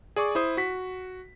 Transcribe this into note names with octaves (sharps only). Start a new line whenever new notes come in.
G#4 D5 C#6 D6
E4 C5 D#6
F#4 B6